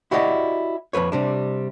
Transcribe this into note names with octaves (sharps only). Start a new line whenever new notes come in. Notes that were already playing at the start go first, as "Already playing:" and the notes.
E4 F#4 G4 D5 D#5 F#5
F2 C3 B4 C#5
C3 G3 D4